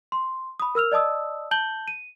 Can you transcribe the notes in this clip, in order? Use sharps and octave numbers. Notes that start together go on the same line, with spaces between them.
C6
B5 D#6
A#4 E6 F6 F7
D5 D#5 A5 D#6 E6
A5 G6 F#7 G7
D#7